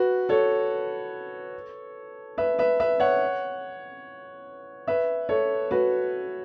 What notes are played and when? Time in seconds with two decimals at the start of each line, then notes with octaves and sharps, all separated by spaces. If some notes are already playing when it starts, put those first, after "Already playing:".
Already playing: F#4 B4
0.29 A4 C#5
2.38 B4 E5
2.59 B4 E5
2.80 B4 E5
3.00 C#5 F#5
4.87 B4 E5
5.29 A4 C#5
5.71 F#4 B4